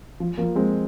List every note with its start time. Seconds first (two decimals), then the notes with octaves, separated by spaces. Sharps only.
0.20 F3
0.38 F3 A#3
0.56 G#3 C4